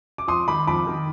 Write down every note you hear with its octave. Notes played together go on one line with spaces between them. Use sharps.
D6
F2 C6 D#6
D#3 B5 D6
F2 B5 D6
D#3